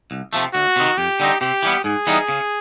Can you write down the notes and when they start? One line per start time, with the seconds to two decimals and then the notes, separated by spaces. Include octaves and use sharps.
0.11 C2
0.33 C3 F3 A3
0.54 D2 F#4
0.76 C3 D#3
0.97 F2 G4
1.20 D3 G3 C4 D#4
1.41 C3 G4
1.63 E3 G3 B3
1.84 G#2 G#4
2.07 E3 G3 B3 D#4
2.28 C#3